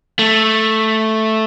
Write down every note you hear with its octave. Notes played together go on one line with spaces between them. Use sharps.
A3